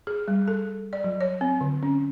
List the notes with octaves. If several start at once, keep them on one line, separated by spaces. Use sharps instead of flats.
G#4
G3
A4
D5
F#3
C#5
C4
D3
C#4